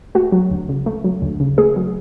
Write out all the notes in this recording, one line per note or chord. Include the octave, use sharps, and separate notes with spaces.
A3 F#4
F#3
D2
C#3
A3
F#3
D2
C#3
A3 G#4
F#3